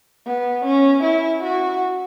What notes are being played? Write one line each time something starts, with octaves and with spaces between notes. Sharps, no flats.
B3
C#4
E4
F#4